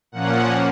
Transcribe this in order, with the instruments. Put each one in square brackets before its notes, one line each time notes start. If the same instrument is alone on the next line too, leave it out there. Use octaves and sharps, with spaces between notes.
[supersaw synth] A#2 F3 A#3 C#4 F#5